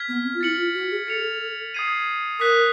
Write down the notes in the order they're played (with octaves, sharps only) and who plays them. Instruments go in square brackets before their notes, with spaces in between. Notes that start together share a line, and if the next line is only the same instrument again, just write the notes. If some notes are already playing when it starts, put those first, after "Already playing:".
Already playing: [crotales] F6 G#6 B6
[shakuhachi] B3
C4
F4
[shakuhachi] E4 [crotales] A6 C#7 F#7
[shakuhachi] F4
F#4
G#4
[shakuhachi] A4 [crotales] A6 C#7 F7
[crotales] D#6 G#6 C7 D#7
[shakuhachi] A#4 [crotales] D#6 F#6 B6